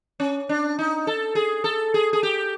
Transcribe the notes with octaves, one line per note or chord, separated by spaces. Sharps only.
C#4
D4
D#4
A4
G#4
A4
G#4
G#4
G4